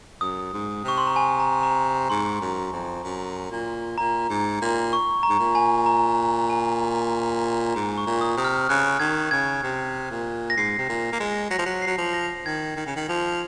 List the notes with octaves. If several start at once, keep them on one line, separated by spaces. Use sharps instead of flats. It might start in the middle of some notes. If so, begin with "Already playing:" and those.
F#2 D#6
G#2
C3 C#6
C6
A#5
G#5
A#5
A#5
A#5
G#2 C6
F#2
F2
F#2
A#2
A#2 A#5
G#2
A#2
C#6
A#5
G#2
A#2
G#5
A#5
G#5
G#2 A#5
C#6
A#2
D#6
C3 D#6
F6
C#3 F#6
D#3 G#6
C#3 G#6
C3
A#2
A#6
G#2 C7
C3
A#2
A#3
G#3
F#3 A#6
F3
F#3
F#3 C7
F3
A#6
D#3 G#6
D#3
C#3
D#3
F3